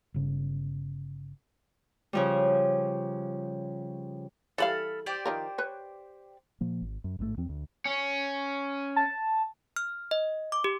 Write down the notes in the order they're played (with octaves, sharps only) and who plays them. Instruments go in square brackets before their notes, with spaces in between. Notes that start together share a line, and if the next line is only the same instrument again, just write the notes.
[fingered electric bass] G1 C#3
[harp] C#3 F3 G3
[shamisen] E3 G3 F5 [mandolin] A4 B5 F6
[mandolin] G4 C5 D5
[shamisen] D#3 F3 A#4
B4 C#5
[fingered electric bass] A#2 F3 A#3
G#1
F#2
A1 G#2 C#3 A3
E2 F3 C4
D2
[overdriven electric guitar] C#4
[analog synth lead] A5
[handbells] F6
D#5
D6
G4